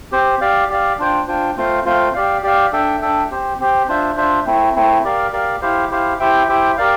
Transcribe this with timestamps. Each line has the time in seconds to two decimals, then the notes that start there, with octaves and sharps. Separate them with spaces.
0.12 C4 G4 C5
0.41 G4 D5 F5
0.70 G4 D5 F5
0.99 D4 F4 C5 G5
1.28 D4 F4 C5 G5
1.57 A3 C4 F4 C5 F5
1.85 A3 C4 F4 C5 F5
2.14 G4 D5 F5
2.43 G4 D5 F5
2.73 D4 A4 E5 G5
3.02 D4 A4 E5 G5
3.31 C4 G4 C5
3.60 C4 G4 C5
3.88 D4 F4 C5 E5
4.17 D4 F4 C5 E5
4.46 A3 C4 E4
4.76 A3 C4 E4
5.04 G4 A#4 D5 F5
5.33 G4 A#4 D5 F5
5.62 E4 G4 C5 F5
5.90 E4 G4 C5 F5
6.20 E4 G4 C5 E5 G5
6.49 E4 G4 C5 E5 G5
6.77 G4 A#4 D5 F5